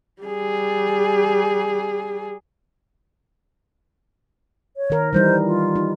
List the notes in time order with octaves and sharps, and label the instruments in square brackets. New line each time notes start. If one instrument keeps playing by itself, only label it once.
[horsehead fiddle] G3 G#4
[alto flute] C#5
[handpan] D#3 A#4
[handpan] E3 G3 D#4 [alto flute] C5
[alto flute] F4
[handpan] D#4